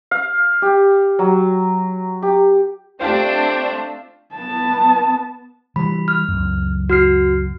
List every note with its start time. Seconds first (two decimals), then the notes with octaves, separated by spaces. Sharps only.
0.11 F5
0.62 G4
1.19 F#3
2.22 G4
3.01 A3 C4 D4 F4 G4 C5 G5
4.35 B3 A5
5.76 E3 G3 B5
6.08 F6
6.28 C#2 F#2
6.90 F#4 F6 C7